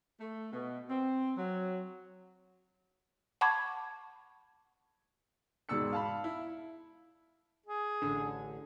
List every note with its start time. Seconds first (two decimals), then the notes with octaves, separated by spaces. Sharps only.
0.20 A3
0.53 B2
0.89 C4
1.37 F#3
3.41 F#5 A5 B5 C#6 D6 G#6
5.69 E1 G#2 B2 D5 E6 C#7
5.92 F5 A5 B5
6.24 E4
7.66 G#4
8.02 A1 D3